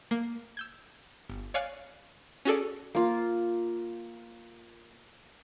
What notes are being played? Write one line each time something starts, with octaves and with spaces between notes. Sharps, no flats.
A#3
E6 G6 G#6
G1
C#5 D5 F5 G#5 F6 F#6
C#4 F#4 G#4 A4 D5
A#3 F4